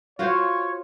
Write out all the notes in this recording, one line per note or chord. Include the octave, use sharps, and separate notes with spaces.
F4 F#4 C5 C#5